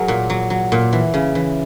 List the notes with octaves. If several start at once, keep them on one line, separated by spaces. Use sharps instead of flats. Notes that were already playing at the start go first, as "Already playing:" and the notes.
Already playing: F#3 G#4 A#4
A#2
F#3
F#3
A#2
E3
C#3
E3